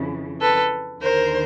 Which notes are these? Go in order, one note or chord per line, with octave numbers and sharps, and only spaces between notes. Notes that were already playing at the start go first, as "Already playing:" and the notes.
Already playing: F2 C#3 E3
A4 B4
D#2 D3 A#4 C5